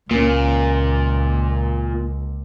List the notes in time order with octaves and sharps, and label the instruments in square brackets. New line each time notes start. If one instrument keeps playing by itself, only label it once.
[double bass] C#2 [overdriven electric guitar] A#2 [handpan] A#3 C#4